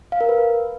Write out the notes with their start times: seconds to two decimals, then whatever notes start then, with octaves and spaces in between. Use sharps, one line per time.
0.12 F5
0.21 A#4
0.29 B4